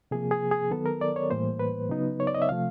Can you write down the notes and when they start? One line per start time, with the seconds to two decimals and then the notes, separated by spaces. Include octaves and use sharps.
0.11 C3 F3 A#3 G#4
0.31 G#4
0.51 G#4
0.71 D#3 F#3 B3 A4
0.86 A#4
1.01 D5
1.16 C#5
1.30 A2 E3 G3 A#3 C5
1.59 B4
1.89 C#3 F#3 B3 D#4
2.20 C#5
2.27 D5
2.35 D#5
2.42 E5
2.49 C3 F3 A3 F5